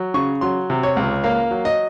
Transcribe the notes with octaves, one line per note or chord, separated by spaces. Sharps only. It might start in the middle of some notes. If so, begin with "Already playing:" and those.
Already playing: F#3
C#3 C#6
F#3 C6
C3
C#5
C#2
A#3 F5
F#3
D#5